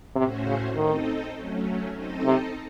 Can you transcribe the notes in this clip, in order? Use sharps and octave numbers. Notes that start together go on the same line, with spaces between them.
A2 C3 A3 C#4 F#4 C5
C#3
D#3 C4 D#4 A4 D#5
F#3 A3 C#4
C4 D#4 A4 D#5
C3